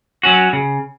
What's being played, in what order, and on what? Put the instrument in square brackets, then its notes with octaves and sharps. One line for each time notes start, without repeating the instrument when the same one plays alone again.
[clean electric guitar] F#3 C#4 F#4
C#3